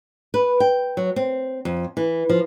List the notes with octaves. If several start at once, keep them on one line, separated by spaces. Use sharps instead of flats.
B4
G5
F#3
C4
F2
E3
F3